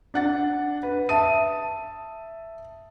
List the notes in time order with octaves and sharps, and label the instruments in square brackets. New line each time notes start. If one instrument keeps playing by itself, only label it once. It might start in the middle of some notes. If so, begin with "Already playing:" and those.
[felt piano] D4 F#5 A6
B4
[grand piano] E5 A5 D#6 [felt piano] D#7